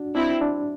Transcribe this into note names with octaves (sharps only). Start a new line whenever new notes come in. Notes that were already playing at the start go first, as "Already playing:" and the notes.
Already playing: D4 F#4
C4 D4 E4
D4